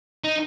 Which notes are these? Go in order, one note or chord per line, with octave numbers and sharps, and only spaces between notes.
D#4